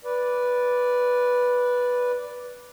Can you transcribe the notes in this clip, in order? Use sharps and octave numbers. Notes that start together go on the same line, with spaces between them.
B4 D5